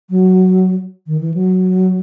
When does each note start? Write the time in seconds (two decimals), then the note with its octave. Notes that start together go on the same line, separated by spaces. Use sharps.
0.10 F#3
1.07 D#3
1.21 E3
1.34 F#3